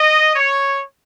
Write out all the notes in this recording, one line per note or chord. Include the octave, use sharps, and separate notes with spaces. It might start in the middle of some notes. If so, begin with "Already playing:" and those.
Already playing: D#5
C#5